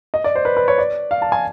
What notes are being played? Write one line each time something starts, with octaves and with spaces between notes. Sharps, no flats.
D#5
D5
C5
B4
B4
C#5
D5
F5
A5
G#5